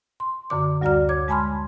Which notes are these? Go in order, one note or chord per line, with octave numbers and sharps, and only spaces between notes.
C6
F#2 D3 D6
D2 G3 F#4 D5 A#5 F6
C#5 D6 G#6
G#3 G#5 A5 B5 C6 F6